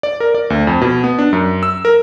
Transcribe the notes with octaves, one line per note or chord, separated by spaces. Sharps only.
D5
A#4
D5
D2
F2
B2
B3
D4
F#2
E6
A#4